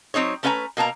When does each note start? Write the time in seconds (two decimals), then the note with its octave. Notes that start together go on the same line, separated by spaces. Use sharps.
0.14 F#3 C4 D#4 C#5
0.43 A3 C#4 B4 E5 G#5 A#5
0.77 B2 A#3 A5 A#5